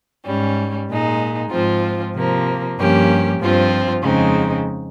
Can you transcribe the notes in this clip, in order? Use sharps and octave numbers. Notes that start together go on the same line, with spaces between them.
G#2 G3 C#4
A#2 G#3 D#4
G#2 F3 C4 F4
C3 F3 A#3
G2 F3 A#3 C#4 G4
G2 F3 C4 F4
F2 C#3 G#3 C4 D#4